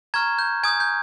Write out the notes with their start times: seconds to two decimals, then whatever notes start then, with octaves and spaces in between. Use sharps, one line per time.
0.14 A#5 C#6 F6 G#6
0.39 G6
0.63 G#5 D#6 G6 G#6
0.80 G6